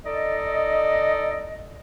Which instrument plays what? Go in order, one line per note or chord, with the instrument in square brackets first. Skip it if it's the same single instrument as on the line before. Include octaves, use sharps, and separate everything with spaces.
[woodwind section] D#4 A4 D5 D#5